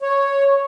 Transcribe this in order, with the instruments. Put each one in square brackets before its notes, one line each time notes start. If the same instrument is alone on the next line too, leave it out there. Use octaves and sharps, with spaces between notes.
[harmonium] C#5